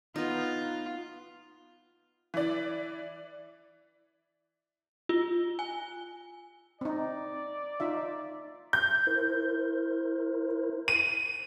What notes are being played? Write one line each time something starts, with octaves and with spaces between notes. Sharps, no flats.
B3 D#4 F4
E3 D5
F4
G#5
C4 D#4 D5
D#4 F4 E5
G6
E4 A#4 C5
D#7